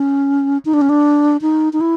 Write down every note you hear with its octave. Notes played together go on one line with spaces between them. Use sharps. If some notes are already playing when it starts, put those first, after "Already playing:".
Already playing: C#4
D#4
D4
C#4
D4
D#4
D#4
E4